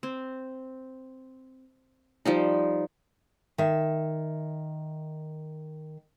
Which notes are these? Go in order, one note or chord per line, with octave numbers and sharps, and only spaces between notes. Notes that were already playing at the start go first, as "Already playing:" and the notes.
C4
F3 G3 D#4
D#3 E5